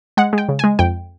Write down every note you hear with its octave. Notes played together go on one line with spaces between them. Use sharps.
G#3 F#5
G#3
G5
C#3
G#5
G#3
F2 G5